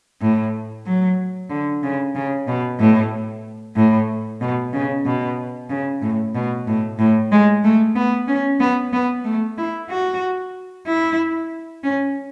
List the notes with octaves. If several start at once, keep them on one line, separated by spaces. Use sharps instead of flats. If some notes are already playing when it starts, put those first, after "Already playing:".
A2
F#3
D3
C#3
C#3
B2
A2
A2
B2
C#3
B2
C#3
A2
B2
A2
A2
G#3
A3
B3
C#4
B3
B3
A3
E4
F#4
E4
C#4